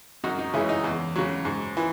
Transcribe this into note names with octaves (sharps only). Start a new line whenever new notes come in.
F#2 D#4 F#4
D#4
C#3 E3 G#3 C#4 E4
D#4
E2
C#3 F#3
G#2
E3